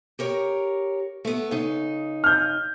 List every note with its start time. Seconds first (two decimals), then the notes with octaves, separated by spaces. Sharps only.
0.19 G4 A#4 C#5
1.25 A3 B3
1.51 C#3 D#4
2.24 F6 G6